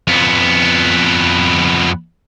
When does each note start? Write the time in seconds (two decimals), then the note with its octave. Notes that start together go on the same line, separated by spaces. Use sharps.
0.08 F2 B3